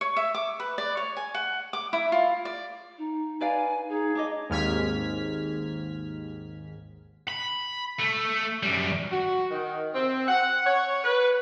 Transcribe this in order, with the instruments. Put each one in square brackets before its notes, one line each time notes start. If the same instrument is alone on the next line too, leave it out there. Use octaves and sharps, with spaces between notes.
[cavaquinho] C#5
E5
D6
B4
D5
C#5
G#5
F#5
D6
E4
F4
D5
[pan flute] D#4
[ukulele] B4 D5 F5 [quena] G#5
[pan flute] D#4 [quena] G#4
[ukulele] D4 C#5 D#5 [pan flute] D6
[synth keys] G#1 D#2 G#2 F6 G#6 B6
[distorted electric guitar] B5
A3
F#2 G3
[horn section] F#4
D#3
C4
F#5
C#5
B4